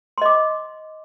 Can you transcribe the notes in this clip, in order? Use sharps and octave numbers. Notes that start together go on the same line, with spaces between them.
D#5 C6 D6